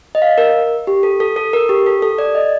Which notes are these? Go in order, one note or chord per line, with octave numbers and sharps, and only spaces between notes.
D#5
F5
A#4
G4
A4
A4
A4
A#4
G4
A4
A4
D5
D#5